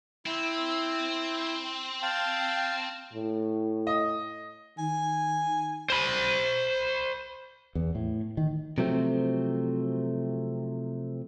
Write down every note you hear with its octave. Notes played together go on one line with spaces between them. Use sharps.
C4 E4
F5 G5 A5
A2
D#5
D#3 G#5
C5 B5
E2
A2
D#3
C3 F3 F#3 A3 C4